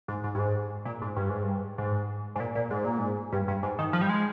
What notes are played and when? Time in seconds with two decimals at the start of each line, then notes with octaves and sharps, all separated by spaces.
0.08 G#2
0.24 G#2
0.35 G2
0.39 G#2
0.85 A#2
1.02 G#2
1.16 G2
1.30 G#2
1.43 G2
1.78 G#2
2.36 G#2
2.40 A#2
2.55 A#2
2.71 G#2
2.84 A#2
2.99 G#2
3.32 G2
3.48 G2
3.63 G#2
3.79 D#3
3.93 F3
4.01 G3
4.09 G#3